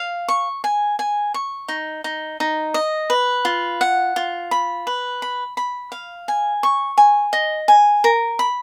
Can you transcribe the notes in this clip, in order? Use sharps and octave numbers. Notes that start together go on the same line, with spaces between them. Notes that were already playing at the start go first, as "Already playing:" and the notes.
Already playing: F5
C#6
G#5
G#5
C#6
D#4
D#4
D#4
D#5
B4
F4
F#5
F4
B5
B4
B5
B5
F5
G#5
C#6
G#5
D#5
G#5
A#4
B5